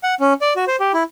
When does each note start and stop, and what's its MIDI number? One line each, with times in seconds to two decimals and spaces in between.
0.03 0.15 78
0.20 0.33 61
0.41 0.53 74
0.56 0.65 66
0.68 0.76 72
0.80 0.92 67
0.94 1.03 64